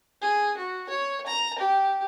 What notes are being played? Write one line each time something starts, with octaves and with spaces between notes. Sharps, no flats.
G#4
F#4
C#5
A#5
G4